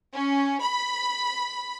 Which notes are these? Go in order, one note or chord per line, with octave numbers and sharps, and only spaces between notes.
C#4
B5